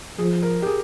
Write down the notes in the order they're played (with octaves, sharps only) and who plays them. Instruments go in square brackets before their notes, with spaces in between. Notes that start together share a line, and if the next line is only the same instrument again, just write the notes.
[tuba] F3 [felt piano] G#4
[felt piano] A#4
G4
G#4